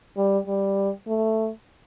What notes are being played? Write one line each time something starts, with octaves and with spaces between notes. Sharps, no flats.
G3
G3
A3